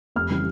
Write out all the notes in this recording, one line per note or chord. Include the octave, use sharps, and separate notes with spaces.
F1 F6
C#3 E3 G3